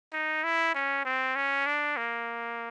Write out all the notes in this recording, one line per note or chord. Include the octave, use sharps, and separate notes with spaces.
D#4
E4
C#4
C4
C#4
D4
A#3